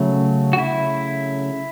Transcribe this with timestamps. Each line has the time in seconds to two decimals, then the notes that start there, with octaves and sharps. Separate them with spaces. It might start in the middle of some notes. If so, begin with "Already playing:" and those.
Already playing: C#3 F#3 A3
0.53 F#4
0.58 E4